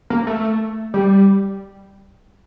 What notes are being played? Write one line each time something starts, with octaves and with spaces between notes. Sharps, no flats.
A#3
A3
G3